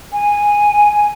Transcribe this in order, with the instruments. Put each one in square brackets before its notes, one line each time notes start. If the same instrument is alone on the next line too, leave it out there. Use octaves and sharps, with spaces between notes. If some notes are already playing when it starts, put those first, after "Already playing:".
[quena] G#5